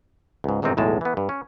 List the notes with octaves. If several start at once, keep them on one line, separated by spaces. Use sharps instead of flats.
C#2 G#2
G1 G#2 C3 D#3 C4 D#4
B1 E2 A2 G#3 A5
E3 B3
G2
C#4